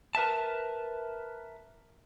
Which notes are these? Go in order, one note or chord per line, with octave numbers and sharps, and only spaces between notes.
A#4 B4 E5 A5